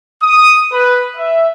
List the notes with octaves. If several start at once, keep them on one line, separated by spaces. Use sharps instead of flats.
D#6
B4
E5